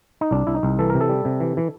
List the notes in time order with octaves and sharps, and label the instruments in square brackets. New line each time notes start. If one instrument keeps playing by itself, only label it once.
[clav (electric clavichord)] D#4
C2 D4
C2 E4
D#4
C2
E3 A4
C3 A#4
A4
G3
C3
E3
E3